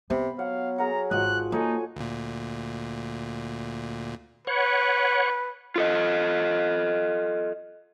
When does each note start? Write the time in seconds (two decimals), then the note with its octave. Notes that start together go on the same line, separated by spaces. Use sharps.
0.10 C3 B3 B5
0.39 F#3 F5 F#5
0.78 G#4 A#4 F#5 A#5
1.11 G#1 F3 F#4 D#5 F#6
1.52 A#3 D#4 A4 C#5 G#5
1.96 D2 A#2
4.47 B4 C#5 F#5
5.76 F4 A4 D#5